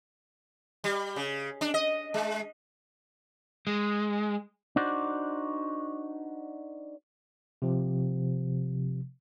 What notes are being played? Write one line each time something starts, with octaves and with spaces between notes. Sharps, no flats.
G3
C#3
D4
D#5
G#3
G#3
D4 D#4 F#4 C5 D5
C3 F3